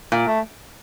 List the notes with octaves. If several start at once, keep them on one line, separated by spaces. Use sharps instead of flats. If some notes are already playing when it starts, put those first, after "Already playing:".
A#2
A3